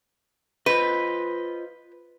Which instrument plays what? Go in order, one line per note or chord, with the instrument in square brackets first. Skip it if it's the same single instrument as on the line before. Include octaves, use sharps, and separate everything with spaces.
[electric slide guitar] F4 C5 D#5 [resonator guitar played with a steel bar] B4